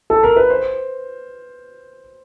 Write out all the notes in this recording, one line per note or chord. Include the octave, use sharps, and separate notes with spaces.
A4
A#4
B4
C5